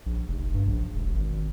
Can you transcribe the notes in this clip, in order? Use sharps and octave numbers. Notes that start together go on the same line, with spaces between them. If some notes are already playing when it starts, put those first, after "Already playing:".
A#1
F1
G2
A#1
E1
G#1